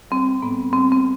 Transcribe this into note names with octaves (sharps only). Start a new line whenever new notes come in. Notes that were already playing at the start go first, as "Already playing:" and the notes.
G3 C4
A2 B3
G3 C4
C4